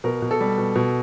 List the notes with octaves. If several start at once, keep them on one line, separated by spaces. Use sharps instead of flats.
B2 A#4
B2
A4
G3
B2
B2